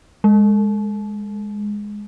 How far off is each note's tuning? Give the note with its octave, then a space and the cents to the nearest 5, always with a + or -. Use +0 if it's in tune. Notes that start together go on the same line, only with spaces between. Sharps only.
G#3 -5